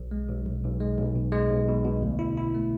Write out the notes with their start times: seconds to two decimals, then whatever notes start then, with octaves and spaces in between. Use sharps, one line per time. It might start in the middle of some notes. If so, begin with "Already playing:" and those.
Already playing: B1
0.11 G#3
0.28 B1
0.46 B1
0.63 B1
0.81 G#3
0.98 B1
1.16 B2
1.32 G#3
1.50 B1
1.68 B2
1.85 B2
2.02 D2
2.19 E4
2.37 E4
2.55 A3